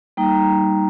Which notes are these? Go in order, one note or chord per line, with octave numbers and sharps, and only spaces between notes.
G3 A#3 D#4 G5 A#5